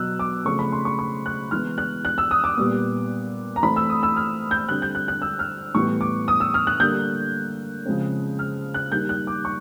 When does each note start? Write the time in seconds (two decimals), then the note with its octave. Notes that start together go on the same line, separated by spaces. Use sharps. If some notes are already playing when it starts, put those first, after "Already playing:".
Already playing: B2 F#3 B3 E6 F#6
0.19 D6
0.45 C#3 F3 A3 C4 C#6
0.59 B5
0.72 C6
0.85 C#6
0.99 C#6
1.26 F#6
1.51 E3 G#3 B3 F6
1.78 F#6
2.05 F#6
2.18 E6
2.31 D#6
2.44 D6
2.57 A#2 G3 B3
3.56 A#5
3.63 E3 A3 C4 B5
3.76 E6
3.90 D#6
4.03 E6
4.16 F6
4.51 G6
4.69 D3 G3 C4 F#6
4.82 G6
4.95 F#6
5.08 F#6
5.22 E6
5.39 F6
5.74 A2 E3 G3 B3 C#6
6.01 D6
6.28 D#6
6.40 E6
6.54 F6
6.67 F#6
6.80 D3 G3 A#3 G6
7.86 C#3 F3 G#3 C4
8.39 F6
8.74 F#6
8.91 D#3 G3 A#3 G6
9.09 F#6
9.27 D6
9.45 C#6